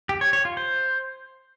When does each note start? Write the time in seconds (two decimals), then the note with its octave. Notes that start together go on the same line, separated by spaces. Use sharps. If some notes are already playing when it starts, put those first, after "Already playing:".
0.09 G4
0.21 C#5
0.33 C#5
0.45 F4
0.57 C5